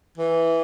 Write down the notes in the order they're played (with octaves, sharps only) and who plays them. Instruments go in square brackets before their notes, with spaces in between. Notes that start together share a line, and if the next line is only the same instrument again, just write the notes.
[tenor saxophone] E3